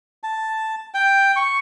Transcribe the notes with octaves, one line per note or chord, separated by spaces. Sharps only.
A5
G5
C#6